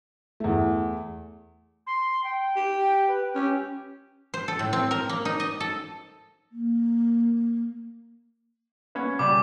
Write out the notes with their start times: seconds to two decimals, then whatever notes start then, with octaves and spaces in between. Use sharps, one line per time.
0.40 E2 A3
1.86 C6
2.24 G5
2.56 G4
3.08 B4
3.35 C#4 G4
4.34 C5
4.48 A4
4.59 A2
4.73 C4
4.91 A#4
5.09 A#3
5.25 D#4
5.40 D#5
5.60 A4
6.52 A#3
8.95 B3 C#4
9.19 C#3 G3 D6